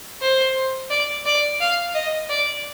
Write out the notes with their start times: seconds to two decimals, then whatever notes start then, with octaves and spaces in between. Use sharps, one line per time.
0.21 C5
0.90 D5
1.26 D5
1.60 F5
1.94 D#5
2.29 D5